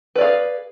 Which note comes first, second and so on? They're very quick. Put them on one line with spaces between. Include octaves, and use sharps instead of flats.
B4 D5 F5 G#4